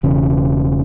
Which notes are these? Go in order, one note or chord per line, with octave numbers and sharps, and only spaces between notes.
E1 E2 C#3